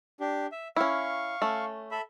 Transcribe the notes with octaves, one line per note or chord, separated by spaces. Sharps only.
D4 G4
E5
C#4 E4 F5 C#6
A3 C#4
A4 E5 B5